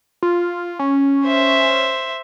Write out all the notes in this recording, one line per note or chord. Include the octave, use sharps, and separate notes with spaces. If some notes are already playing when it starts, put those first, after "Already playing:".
F4
C#4
C5 E5